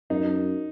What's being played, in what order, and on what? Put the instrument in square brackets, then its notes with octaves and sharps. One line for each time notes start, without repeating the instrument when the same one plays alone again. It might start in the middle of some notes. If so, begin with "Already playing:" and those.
[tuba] F#2 [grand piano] D#4